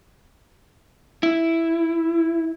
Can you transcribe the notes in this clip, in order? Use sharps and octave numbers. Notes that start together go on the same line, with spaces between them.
E4